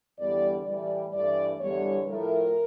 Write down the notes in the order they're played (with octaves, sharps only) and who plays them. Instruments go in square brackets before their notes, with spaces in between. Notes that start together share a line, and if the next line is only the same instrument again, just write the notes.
[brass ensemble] E2 D3 G3 D5
A2 E3 G3 D5
G2 E3 A3 D5
E2 D3 G3 C#5
A2 F3 A3 A#4